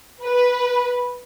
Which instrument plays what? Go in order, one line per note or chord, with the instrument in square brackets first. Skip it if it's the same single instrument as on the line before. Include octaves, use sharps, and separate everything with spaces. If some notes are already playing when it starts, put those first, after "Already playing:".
[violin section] B4